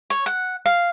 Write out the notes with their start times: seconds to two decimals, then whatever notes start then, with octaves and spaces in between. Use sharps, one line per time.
0.10 C#5
0.26 F#5
0.66 F5